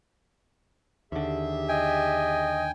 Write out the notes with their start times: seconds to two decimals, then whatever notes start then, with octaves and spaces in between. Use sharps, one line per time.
1.12 D#2 D3 G4 G#4 E5
1.69 D#5 G5 G#5